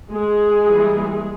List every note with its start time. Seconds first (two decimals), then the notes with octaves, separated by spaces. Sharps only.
0.13 G#3 G#4
0.66 E3 G3 A#3